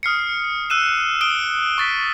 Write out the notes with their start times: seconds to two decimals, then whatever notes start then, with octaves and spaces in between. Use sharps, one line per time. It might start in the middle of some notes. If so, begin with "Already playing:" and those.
0.03 D#6 F6 C7 C#7
0.70 E6 F#6 D#7 E7
1.21 D#6 F6 D7 G7
1.78 C#6 A6 B6